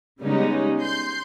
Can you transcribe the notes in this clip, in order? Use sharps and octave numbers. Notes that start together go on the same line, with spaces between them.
C#3 G3 G#3 B3 C#4 D#4
C6 G6